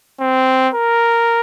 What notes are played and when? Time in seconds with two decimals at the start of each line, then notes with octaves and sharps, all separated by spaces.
0.20 C4
0.74 A#4